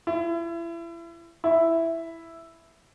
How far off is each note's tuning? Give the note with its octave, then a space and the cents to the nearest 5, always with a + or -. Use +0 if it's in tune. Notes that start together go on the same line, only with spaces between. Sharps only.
E4 +35
E4 +5